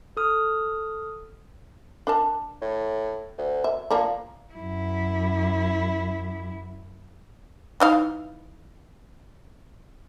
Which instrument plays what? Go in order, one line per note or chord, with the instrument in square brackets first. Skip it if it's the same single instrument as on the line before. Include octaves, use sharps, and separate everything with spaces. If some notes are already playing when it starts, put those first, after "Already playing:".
[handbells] A4 D#6 F6
[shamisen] D4 A#4 A5
[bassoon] A2
D2
[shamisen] E5
[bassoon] A#2 [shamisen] F3 A#3 D4
[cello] F#2 E4
[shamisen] E3 D#4 F5